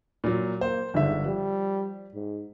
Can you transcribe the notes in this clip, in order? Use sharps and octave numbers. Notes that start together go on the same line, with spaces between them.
A#2 F#3
A#3 C5
G1 G#2 D3 E5
F3 G3
G#2